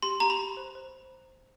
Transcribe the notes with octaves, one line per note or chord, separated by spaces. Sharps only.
G4 C6
G4 A#5
B5
G4
C5
C5